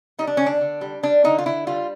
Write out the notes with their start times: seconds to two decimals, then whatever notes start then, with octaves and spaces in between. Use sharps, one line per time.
0.19 G3 D#4
0.27 D4
0.37 D3 C#4
0.46 D4
0.61 D3
0.81 G3
1.03 G3 D4
1.24 D3 D#4
1.38 F4
1.46 D3 E4
1.67 G3 F4